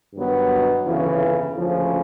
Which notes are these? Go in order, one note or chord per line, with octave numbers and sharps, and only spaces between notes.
G2 D#3 F#3 B3
G1 F2 C#3 E3
D2 C#3 F3 A#3 C#4